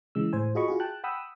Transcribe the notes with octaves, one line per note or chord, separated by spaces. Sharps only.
C#3 E3 G#3 E6
A2 C5 G#5
F4 F#4 G#4 D#5 B5 C#6
F4 F#4 G#4
G5 A5 F#6
F#5 G5 B5 D#6 E6